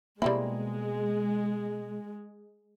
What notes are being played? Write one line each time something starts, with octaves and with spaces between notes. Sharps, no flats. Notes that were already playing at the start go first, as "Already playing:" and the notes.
B2 G3 G#3 A#3 C4 E4